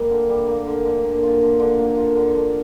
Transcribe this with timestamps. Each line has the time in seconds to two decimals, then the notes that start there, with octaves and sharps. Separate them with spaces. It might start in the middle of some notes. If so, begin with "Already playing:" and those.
Already playing: G3 A#3
0.10 D3
0.29 G3
0.47 A#3
0.66 D3
0.85 D3
1.04 A#3
1.23 F4
1.41 D3
1.59 D3
1.79 A#3
1.97 F4
2.16 D3
2.35 D3